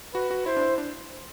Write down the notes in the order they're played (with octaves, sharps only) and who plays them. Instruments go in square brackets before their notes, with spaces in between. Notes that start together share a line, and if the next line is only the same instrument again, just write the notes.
[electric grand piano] F#4 [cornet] B4
[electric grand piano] F#4
[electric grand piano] E4 [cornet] C5
[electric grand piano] D4
E4
D4